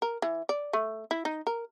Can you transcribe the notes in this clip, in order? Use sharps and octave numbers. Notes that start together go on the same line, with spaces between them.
A#4
E3
D5
A3
E4
D#4
A#4